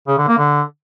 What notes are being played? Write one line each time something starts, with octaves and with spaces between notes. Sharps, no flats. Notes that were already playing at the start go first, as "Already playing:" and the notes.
C#3
D3
A#3
D3